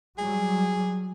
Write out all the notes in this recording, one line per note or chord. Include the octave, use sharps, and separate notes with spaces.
F#3 G3 G#4